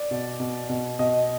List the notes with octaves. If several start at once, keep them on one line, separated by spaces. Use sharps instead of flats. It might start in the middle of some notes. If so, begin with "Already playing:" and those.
Already playing: D5
B2
B2
B2
B2 D#5